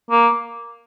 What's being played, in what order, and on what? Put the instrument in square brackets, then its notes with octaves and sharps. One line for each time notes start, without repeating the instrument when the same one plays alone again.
[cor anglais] A#3